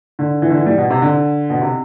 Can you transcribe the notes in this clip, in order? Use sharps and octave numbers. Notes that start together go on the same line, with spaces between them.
D3
E3
D3
E3
G3
B2
C3
D3
B2
C3